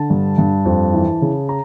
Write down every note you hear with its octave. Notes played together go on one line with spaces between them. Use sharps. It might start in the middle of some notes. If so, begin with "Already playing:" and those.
Already playing: D3 A5
G2
G2
F2
E3
C#3
A#5